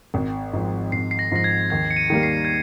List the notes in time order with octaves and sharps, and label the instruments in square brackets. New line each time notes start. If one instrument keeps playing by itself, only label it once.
[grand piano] G#1
G#2 F3
[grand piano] G#1 [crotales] C7
[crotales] C7
A#6
[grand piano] G#2 F3 [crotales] A#6
[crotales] G#6
[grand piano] D#2 [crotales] G#6
[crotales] C#7
D#7
[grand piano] D#3 G3 A#3
[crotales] C7
G#6